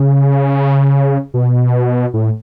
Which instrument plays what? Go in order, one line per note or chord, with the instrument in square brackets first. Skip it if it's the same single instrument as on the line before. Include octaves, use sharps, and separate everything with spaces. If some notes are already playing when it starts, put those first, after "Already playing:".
Already playing: [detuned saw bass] C#3
B2
A2